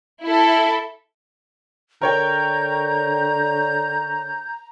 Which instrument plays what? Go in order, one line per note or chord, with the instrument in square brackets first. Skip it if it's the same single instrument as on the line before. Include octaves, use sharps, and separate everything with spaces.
[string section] E4 A4
[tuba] D3 [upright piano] A#4 C#5 G5 [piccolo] A#5 [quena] G6